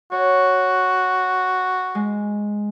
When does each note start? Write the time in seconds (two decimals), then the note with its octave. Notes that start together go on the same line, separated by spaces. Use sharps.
0.12 F#4 C#5
1.95 G#3